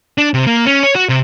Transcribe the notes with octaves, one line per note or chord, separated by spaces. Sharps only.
D4
C3
A#3
C#4
C#5
F#4
C3